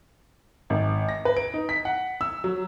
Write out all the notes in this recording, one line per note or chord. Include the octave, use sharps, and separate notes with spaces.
G#1
A#6
B4
D7
D#4
B6
F#5
E6
F#3